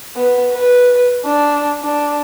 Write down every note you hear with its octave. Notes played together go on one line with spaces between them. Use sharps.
B3
B4
D4
D4